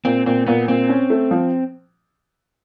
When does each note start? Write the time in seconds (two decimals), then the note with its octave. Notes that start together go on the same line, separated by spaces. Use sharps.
0.05 A#2 C4
0.26 A#2 C4
0.47 A#2 B3
0.68 A#2 C4
0.89 C#4
1.10 A3
1.31 F3